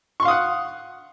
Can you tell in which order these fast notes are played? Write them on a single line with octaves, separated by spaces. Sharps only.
C#6 C6 F5 D#6 F#5